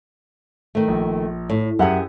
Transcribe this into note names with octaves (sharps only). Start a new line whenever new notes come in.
D#3 A3
A#1
A2
F#2 G4 G#4 E5 F#5